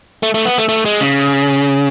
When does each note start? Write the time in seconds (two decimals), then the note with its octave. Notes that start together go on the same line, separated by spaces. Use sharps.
0.23 A3
0.34 A3
0.45 B3
0.58 A3
0.69 A3
0.85 G#3
1.01 C#3